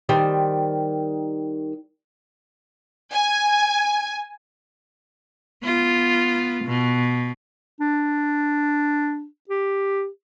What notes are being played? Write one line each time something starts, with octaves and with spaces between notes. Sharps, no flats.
D#3 G3 C5
G#5
B3 F4
B2
D4
G4